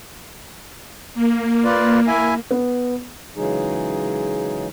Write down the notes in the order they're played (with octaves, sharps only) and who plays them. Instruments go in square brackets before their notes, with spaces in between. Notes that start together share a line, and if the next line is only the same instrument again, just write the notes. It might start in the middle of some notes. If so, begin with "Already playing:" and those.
[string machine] A#3
[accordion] F4 B4 D5
E4 E5 G#5
[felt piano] B3
[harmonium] C#3 E3 F#3 G#3 D#4 G#4